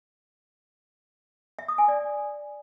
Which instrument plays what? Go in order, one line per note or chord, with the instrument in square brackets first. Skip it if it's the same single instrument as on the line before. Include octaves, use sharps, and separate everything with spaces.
[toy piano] E5
D#6
G#5
D5